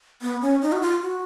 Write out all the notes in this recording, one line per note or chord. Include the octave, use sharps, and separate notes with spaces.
B3
C#4
D#4
F#4
F4
F#4